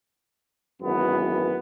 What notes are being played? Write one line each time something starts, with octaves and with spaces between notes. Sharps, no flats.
G#1 F#2 E3 B3